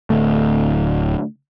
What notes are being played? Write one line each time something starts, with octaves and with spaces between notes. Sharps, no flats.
D1 D2 A3